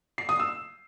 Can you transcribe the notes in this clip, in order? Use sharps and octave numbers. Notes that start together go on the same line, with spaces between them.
C7
D#6
E6